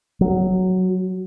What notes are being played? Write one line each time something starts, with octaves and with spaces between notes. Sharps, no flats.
F#3